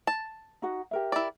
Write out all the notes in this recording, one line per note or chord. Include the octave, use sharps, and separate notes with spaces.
A5
D#4 F#4 F#5
G4 A#4 E5
E4 D5